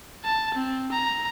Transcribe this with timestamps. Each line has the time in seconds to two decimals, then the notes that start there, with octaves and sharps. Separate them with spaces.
0.24 A5
0.55 C4
0.92 A#5